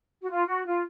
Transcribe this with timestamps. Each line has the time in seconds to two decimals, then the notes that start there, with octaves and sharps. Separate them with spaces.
0.21 F#4
0.30 F4
0.46 F#4
0.65 F4